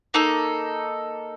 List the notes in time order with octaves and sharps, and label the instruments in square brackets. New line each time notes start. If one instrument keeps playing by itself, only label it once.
[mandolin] A#3 D#4 A4